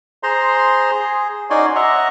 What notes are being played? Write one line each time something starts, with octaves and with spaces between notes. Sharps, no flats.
G#4 C5 A#5 C6
G#4
C#4 D#4 F#4 D5 G#5 C6
D#5 E5 F#5 A#5